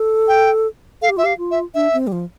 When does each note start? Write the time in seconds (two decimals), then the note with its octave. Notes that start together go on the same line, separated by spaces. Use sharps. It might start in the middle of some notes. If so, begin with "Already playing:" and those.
Already playing: A4
0.28 G5
1.02 A4 F5
1.09 G4
1.17 F4 E5
1.23 G4 F5
1.38 F4
1.51 E5
1.74 D4 E5
1.93 C4
2.07 G3
2.12 F3